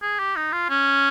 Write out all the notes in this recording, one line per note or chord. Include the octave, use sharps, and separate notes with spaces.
G#4
G4
D#4
F4
C#4